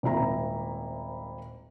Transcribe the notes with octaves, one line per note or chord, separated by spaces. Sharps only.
D#1 G#1 E4 A#5